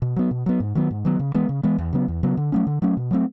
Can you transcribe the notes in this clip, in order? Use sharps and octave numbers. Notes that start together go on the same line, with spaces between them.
B2
F#3 B3
B2
F#3 B3
G#2
D#3 F#3 B3
G#2
D#3 F#3 B3
C#3
E3 G#3 B3
C#3
E3 G#3 B3
E2
C#3 F#3 B3
E2
C#3 F#3 B3
D3
F#3 A3 C#4
D3
F#3 A3 C#4
B2
F#3 A3 C4